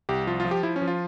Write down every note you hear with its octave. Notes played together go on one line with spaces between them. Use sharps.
C2 G4
F3 F4
F4
F3
G4
F3 E4
C#4
F3
F4